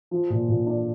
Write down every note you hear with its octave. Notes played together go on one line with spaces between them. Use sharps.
F3
A#2
A#2
D4